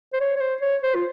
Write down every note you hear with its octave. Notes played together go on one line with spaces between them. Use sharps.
C5
C#5
C#5
C5
C#5
C5
F4